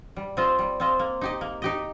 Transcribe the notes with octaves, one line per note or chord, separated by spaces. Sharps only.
G3
C4 F4 D#5
G3
C4 F4 D#5
A#3
D#4 G4 D#5
A#3
D#4 G4 D#5